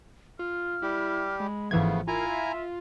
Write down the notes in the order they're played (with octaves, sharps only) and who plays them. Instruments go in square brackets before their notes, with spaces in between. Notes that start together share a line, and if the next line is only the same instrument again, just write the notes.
[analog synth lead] F4 [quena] F6
[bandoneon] G3 G4 [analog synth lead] E4
[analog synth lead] G#3 [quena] B5
[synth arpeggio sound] G#1 E3 G#6 [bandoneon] C#3 A3 B3 [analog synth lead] F3 [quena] F5
[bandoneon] E4 G#5 A#5 [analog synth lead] F4 [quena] A#4
[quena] E5